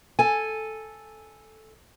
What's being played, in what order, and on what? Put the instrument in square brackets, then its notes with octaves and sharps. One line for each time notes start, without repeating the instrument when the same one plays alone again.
[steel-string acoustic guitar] A4 G#5